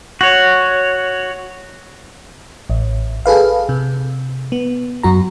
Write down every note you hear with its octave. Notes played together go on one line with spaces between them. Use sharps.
F#4 C#5
A1
G#4 A4 B4 F5
C3
B3
F#2 F#4 A#5